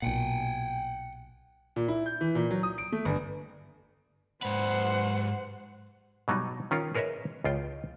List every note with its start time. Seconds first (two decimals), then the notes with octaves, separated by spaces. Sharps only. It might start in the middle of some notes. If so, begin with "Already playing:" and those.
0.02 B1 A#2 F#5 G5
1.76 A#2
1.88 E4
2.06 G6
2.21 E3
2.35 A#2
2.51 F#3
2.63 D#6
2.78 D7
2.92 A3
3.05 G1
4.42 G#2 B4 C5 F#5
6.28 B2 F#3 G3 D#4
6.71 D#3 C#4 F4 A#4
6.95 G#4 A#4 B4 C#5 D#5 E5
7.44 C#2 F4 G5